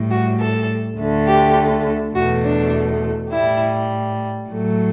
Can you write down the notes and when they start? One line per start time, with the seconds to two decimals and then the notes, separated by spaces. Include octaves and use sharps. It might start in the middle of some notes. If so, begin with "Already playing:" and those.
Already playing: A2 G3
0.10 F#4
0.39 A4
0.98 D2 D3 A3
1.27 G4
2.15 E2 B2 A3 F#4
2.44 D4
3.32 A2 G3 E4
4.49 A2 F#3 A3